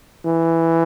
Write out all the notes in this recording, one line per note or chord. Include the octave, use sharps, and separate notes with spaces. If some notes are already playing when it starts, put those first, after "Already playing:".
E3